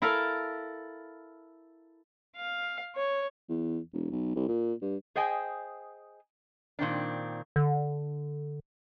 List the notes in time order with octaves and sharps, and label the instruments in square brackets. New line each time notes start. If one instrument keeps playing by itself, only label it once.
[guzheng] E4 A4 A#4 E5 F5
[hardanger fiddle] F5
C#5
[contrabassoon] E2
E1
B1
C2
A#2
G2
[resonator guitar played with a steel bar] G#4 C5 D#5 G5 G#5
A#2 D#3 C4 D4
[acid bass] D3